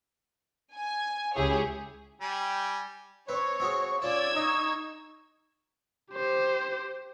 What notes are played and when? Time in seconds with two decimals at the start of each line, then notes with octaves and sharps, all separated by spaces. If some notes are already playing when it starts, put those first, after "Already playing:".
0.75 G#5
1.35 C#2 E4 G4 G#4 C#5
2.21 G3 G5 G#5
3.29 C4 B4 C#5
3.60 C4 F#4 G#4 C#6
4.02 C#4 F4 C#5 D5 E6 G#6
4.36 D#4 D#5 C#6
6.13 G4 C5